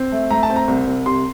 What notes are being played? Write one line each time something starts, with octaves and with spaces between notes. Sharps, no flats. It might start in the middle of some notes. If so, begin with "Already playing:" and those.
Already playing: C4
A3
A3 A#5
A5
C4
A#5
C2
C2
C3 C6